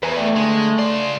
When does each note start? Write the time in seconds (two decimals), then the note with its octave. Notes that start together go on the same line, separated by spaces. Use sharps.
0.03 E2 B4 G#5 A#5
0.16 A3 D5 G5 G#5
0.36 D3 G#3
0.79 C#3 D5 C6